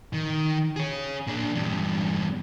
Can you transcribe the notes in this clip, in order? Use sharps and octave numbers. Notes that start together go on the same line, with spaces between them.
D#3
G#4 C#5
A#2 D4
E2 G2